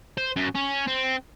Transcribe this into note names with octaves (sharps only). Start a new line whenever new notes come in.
C5
F#2
C#4
C4